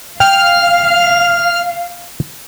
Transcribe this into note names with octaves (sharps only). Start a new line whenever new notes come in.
F5 G5 F6